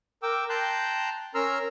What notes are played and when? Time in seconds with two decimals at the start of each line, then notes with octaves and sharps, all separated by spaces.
0.23 A#4 G5 D6 E6
0.49 G5 A5 A#5 C6 F#6 G6
1.35 C#4 A#4 A#5 C6 E6 F6